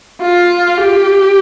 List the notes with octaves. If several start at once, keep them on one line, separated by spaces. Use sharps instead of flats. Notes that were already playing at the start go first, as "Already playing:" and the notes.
F4
G4